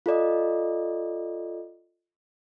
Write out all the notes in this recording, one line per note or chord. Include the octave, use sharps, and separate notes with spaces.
F4 A4 D5 D#5